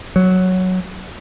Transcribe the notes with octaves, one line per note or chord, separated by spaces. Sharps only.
F#3